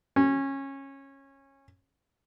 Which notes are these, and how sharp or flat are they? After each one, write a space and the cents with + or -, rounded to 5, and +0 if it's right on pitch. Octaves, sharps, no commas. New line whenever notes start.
C#4 -20